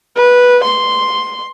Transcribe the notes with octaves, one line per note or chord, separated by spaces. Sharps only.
B4
C6